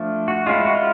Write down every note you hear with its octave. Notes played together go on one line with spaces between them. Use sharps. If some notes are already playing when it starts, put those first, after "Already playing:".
Already playing: F3 A3 D4
F#4
G#3 C#4 E4 F4
F#4
F4